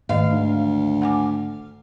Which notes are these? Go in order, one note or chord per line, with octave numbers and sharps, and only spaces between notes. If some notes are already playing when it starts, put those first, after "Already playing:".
G#1 G#2 D#3 A3 D#5 F5
D2
F#5 G#5 D6